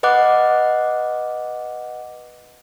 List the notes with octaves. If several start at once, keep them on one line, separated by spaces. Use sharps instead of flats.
B4 D#5 F#5 D6 F#6